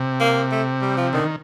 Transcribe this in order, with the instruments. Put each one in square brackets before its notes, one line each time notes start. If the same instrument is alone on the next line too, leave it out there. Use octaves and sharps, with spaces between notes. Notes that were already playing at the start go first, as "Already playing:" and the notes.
Already playing: [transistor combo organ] C3
[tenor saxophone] A#3
A3
G3
F3
[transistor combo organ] D3 [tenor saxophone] D#3
[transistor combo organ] D#3